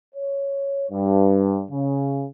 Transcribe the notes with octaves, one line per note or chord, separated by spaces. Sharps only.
C#5
G2
C#3